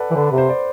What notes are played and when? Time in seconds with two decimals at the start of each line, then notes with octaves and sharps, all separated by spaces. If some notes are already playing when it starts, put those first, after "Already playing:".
Already playing: A4 B4 D5 F#5
0.11 E3
0.15 D3 B4
0.31 C3
0.38 C5
0.49 D5